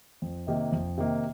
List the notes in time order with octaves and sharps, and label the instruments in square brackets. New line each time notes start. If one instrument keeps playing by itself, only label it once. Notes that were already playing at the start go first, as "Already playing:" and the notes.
[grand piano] F2
C3 D#3 A#3 D#4
F2
C3 D#3 A#3 D#4